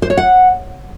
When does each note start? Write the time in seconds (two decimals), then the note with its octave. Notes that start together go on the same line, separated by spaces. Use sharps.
0.02 C5
0.10 C#5
0.17 F#5